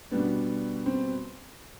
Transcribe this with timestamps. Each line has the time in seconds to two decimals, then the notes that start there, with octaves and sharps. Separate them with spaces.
0.11 B2 G3 B3 D4
0.86 C4